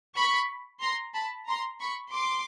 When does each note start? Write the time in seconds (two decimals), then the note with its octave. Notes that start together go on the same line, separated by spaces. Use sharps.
0.16 B5 C#6
0.81 A#5 C6
1.14 A5 B5
1.47 A#5 C6
1.80 B5 C#6
2.13 C6 D6